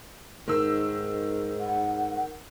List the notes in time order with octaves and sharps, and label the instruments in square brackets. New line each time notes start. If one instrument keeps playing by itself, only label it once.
[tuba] G#2 [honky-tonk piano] D#3 E6
[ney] F#5